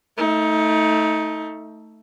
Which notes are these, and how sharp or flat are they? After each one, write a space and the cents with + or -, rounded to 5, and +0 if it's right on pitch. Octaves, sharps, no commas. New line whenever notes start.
A3 +5 D#4 +25